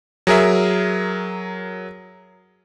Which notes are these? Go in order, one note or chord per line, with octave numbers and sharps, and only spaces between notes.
F#3 G#4 A#4 E5